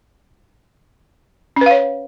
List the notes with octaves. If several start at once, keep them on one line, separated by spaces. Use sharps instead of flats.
C#4 B4 C#5 F5